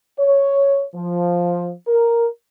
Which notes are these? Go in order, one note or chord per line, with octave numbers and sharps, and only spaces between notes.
C#5
F3
A#4